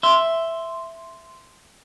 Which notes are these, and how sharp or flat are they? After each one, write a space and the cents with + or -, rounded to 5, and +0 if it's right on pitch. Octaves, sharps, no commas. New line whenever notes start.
E5 +5 C6 +0